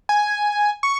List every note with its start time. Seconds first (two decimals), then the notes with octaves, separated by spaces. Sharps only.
0.09 G#5
0.83 C#6